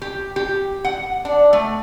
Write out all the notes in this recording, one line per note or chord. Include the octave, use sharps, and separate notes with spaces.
G4
G4
F#5
D4
A3